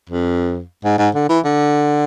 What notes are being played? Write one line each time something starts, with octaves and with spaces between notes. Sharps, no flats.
F2
G#2
G#2
D3
E3
D3